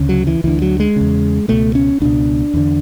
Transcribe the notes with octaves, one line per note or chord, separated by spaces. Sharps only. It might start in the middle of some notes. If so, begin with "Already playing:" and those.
Already playing: D2 C#3
F#3
E3
D2 D3 E3
F#3
G#3
E2 C#3
C#2 B2 A3
C#4
C#2 B2 D4
E2 D3